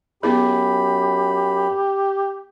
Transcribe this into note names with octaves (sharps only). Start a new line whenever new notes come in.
F#2 B3 E4 G4 G#4 B5